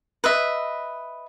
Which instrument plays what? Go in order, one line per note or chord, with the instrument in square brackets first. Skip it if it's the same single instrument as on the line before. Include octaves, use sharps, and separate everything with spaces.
[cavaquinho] B4 D#5 E5